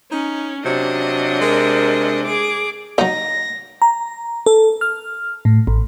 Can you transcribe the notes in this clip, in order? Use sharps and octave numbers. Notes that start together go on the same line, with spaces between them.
C#4 D#4
C3 F#3 D4 D#5
G#3 A#4
G#4 D6
F#3 A#3 D#4 A#6
A#5
A4
F6
A2
A1